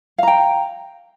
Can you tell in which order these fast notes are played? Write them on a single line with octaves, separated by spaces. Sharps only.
F5 A#5 G5